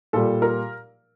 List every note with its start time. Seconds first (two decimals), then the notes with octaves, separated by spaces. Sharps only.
0.13 A#2 G3 A4
0.42 A#4